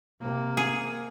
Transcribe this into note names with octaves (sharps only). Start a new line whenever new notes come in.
C3 A#3
G#4